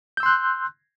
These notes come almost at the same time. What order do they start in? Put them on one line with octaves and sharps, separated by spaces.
G6 E6 C6 F#6